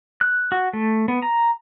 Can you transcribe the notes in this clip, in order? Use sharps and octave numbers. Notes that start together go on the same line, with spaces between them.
F#6
F#4
A3
B3
A#5